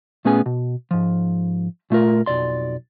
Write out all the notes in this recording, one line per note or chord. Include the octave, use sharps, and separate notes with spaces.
A#2 A3 B3 C#4 G#4 G#5
B2
G#2 F3
A#2 A3 F4 A#4
B1 F2 D5 C6